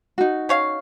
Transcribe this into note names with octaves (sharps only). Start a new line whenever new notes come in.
D#4 F#4
C#4 C#5 F5